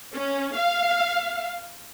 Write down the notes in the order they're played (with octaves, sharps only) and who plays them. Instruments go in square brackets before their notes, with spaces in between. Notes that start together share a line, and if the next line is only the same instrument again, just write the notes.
[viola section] C#4
F5